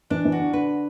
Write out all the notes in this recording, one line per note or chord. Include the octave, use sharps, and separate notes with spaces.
E3 D4
E3
F#4
D3
D3 B4